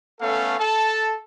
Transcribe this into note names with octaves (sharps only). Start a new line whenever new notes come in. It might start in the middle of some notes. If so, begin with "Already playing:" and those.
A3 B3 C#4 A4 F5
A4 A5